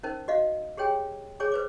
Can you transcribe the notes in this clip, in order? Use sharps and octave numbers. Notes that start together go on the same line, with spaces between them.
C#4 D#4 A#4 C5
F#4 D#5 F5
G4 G#4 C#5 G5 G#5
G#4 C#5 G#5 D6
B4 C5 D6